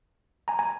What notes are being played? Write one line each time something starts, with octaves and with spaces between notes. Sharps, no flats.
G#5 A#5
G#5 A#5